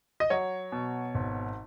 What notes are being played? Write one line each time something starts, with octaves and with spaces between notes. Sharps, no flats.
D#5
F#3 C#5
B2
G#1